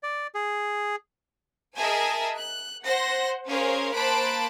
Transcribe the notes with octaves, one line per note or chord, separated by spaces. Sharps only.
D5
G#4
G#4 A#4 D#5 E5 G#5 A5
F#6
C5 F#5 A#6
C#4 G#4 A#4 C5 C#5 F5
A#3 C5 A5 B5 F#6 D7